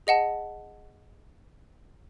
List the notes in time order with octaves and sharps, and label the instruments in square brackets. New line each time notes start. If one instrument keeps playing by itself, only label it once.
[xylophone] G#4 D#5 F#5 A5